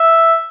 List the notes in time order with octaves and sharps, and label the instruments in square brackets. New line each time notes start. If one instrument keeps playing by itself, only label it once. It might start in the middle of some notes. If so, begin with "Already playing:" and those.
Already playing: [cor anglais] E5